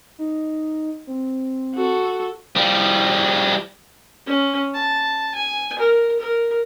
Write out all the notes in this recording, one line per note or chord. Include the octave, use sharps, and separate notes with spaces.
D#4
C4
F#4 A4
F3 G3
C#4
A5
G#5
A#4
A#4